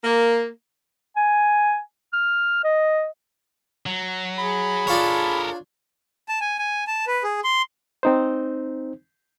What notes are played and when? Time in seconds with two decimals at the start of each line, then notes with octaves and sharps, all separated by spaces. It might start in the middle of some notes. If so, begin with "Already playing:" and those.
0.04 A#3
1.17 G#5
2.13 F6
2.64 D#5
3.86 F#3
4.38 G#4 B5
4.87 D4 F4 A4 A#4 C#5
6.29 A5
6.41 G#5
6.59 G#5
6.87 A5
7.07 B4
7.24 G#4
7.44 C6
8.03 C4 D#4 C5